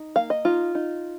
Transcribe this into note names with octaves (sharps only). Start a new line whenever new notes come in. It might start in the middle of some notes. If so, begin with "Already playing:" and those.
Already playing: D#4
A#3 F5
D#5
D#4 F4
D#4